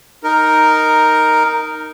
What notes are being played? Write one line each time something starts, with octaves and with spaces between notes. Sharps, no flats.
D#4 A#4